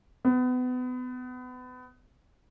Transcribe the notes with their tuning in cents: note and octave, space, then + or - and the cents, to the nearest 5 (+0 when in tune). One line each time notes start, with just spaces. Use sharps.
B3 +30